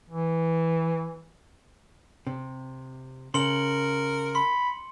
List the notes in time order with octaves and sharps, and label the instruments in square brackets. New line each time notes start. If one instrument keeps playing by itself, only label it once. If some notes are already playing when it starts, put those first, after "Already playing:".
[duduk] E3
[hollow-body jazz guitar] C3
[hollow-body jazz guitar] C#3 [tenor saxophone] A#4 [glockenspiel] C6 C#7 F#7
[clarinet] B5 [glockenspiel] C6